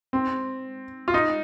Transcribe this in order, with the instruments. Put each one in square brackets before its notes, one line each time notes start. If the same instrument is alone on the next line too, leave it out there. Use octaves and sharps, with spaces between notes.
[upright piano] C4
F4
D#4